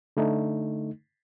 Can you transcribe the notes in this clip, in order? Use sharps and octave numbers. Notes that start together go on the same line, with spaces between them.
D3 A3 D#4